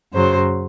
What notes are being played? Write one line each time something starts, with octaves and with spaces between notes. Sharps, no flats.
F#2 C#3 F#3 C5